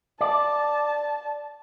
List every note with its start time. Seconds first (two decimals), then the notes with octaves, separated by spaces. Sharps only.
0.21 D5 A5